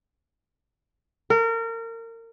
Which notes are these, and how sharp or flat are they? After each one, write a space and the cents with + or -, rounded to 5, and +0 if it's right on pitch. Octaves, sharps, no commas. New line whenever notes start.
A#4 -30